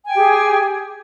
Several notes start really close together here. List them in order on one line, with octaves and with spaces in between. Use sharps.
G#5 G5 G4 G#4